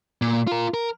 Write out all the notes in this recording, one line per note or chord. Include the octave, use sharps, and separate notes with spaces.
A#2
F4 A#4
A#4